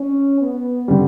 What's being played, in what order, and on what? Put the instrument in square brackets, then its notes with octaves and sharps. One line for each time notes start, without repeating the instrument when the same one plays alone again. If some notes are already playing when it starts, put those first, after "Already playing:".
Already playing: [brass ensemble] C#4
B3
[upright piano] D3 G3